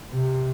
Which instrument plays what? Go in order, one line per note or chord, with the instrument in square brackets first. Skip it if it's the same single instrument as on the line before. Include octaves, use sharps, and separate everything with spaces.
[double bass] C3